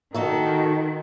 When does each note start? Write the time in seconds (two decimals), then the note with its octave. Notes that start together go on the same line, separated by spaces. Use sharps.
0.14 D#3 D#4 F#4 A4